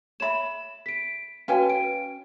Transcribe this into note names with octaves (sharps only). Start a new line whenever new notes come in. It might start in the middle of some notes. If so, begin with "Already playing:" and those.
C#5 E5 B5 E7
B6 D7
C#4 F#4 B4 F5 G5 G#5
D7